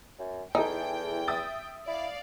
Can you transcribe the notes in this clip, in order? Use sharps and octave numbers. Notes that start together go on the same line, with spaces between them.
F#2
E2 D#4 E4 G#4 A4 G5
E5 D#6 A6
E4 D5 F5